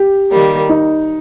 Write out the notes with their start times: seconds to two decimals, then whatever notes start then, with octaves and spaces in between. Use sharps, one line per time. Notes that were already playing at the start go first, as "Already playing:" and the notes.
Already playing: G4
0.31 D#3 G3 A#3
0.69 D#4